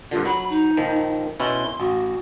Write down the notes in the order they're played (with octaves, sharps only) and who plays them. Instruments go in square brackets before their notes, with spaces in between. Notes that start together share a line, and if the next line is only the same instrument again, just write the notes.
[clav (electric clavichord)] G2 A#2 D3 [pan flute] F4
[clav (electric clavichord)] F#3 [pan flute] B5
[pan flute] D#4
[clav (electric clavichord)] A#1 D#3 F3
[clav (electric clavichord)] B2 C#4 E4 [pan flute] C6
[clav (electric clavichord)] A1 [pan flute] F#4